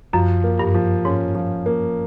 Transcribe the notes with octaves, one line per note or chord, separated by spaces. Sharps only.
F#2 F3
A#3
G2
F3
G#2 C#4
F3
A#3